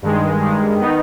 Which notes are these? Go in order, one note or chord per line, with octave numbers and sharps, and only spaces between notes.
G2 D#3 G#3
G2 D#3 G#3
D#3 B3 D#4